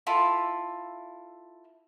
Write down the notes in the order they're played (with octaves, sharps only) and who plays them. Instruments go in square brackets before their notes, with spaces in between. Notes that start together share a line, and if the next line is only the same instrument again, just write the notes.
[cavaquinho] E4 F4 A4